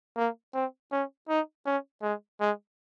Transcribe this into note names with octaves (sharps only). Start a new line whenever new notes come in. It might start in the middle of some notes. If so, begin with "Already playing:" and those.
A#3
C4
C#4
D#4
C#4
G#3
G#3